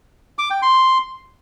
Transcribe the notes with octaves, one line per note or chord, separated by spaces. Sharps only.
D6
G5
C6